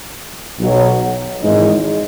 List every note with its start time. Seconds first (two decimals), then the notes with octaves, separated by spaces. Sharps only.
0.59 B1 B2 F#3
1.41 G#1 G#2 E3 G#3 D#4